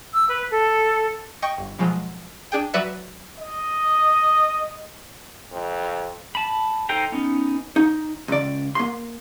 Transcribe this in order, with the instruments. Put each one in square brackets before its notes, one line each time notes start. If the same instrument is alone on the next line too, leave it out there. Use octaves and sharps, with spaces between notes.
[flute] E6
B4
A4
[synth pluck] D#5 G5 C#6
G1
B2 F3 F#3 G#3
D4 G#4 G5
F#3 F#4 B4 D5 E5 F#5
[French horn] D#5
F2
[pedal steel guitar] A5 B5
D#4 A4 C5 G5 A#5
B3 C#4 D#4
[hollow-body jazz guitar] D#4
C#2 D5
A#3 C6